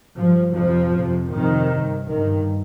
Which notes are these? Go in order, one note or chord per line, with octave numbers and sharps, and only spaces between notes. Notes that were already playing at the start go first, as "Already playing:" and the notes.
G2 F3
F2 C3 F3
F2 C3
F2 C3 D#3
G2
G2 D#3